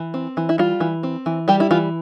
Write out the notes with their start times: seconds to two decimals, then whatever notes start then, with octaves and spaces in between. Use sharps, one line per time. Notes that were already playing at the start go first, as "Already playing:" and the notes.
Already playing: E3
0.14 C4
0.37 E3
0.49 E4
0.58 G3 F4
0.80 E3
1.03 C4
1.26 E3
1.48 G3 G4
1.60 E4
1.71 E3 F4